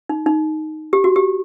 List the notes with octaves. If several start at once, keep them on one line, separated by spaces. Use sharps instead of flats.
D#4
D#4
G4
F#4
G4